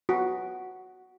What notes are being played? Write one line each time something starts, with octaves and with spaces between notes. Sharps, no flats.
F#4